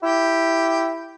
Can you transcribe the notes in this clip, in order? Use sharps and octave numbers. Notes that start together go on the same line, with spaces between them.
E4 G4